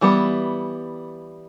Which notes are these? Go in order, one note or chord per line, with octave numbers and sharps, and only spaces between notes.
E3 G3 B3